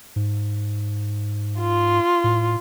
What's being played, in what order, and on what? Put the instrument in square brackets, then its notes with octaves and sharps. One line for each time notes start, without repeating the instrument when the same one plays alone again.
[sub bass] G#2
[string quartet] F4
[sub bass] A2